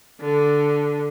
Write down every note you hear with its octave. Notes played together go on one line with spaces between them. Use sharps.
D3